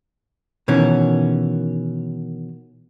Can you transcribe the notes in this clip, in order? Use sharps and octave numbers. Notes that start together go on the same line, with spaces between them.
B2 D#3 E3 C#4